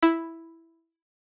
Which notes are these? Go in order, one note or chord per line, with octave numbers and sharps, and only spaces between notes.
E4